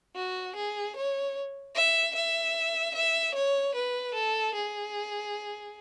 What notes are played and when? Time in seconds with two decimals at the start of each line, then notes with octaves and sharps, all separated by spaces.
0.15 F#4
0.56 G#4
0.96 C#5
1.75 E5
2.15 E5
2.95 E5
3.35 C#5
3.75 B4
4.14 A4
4.55 G#4